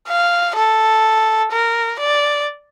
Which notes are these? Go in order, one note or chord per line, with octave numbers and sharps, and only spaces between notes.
F5
A4
A#4
D5